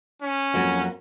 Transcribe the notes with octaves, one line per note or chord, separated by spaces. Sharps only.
C#4
F2 F#3 A#3